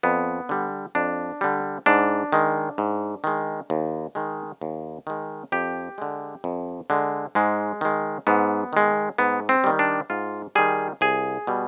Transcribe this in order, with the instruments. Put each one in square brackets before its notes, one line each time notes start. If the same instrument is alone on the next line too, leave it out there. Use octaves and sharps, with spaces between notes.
[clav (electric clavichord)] F2 B3
D3 G3
F2 D4
D3 G3
G#2 D4
D#3 G#3
G#2
D#3 G#3
D#2
D#3 G#3
D#2
D#3 G#3
F2 G4
D3 G#3
F2
D3 G#3
G#2 G#3
D#3 G#3
G#2 B3
D#3 G#3
G#2 B3
C4
D#3 G3
D4
G#2 F4
D#3 G3 G#4
C2 G#4
B2 G3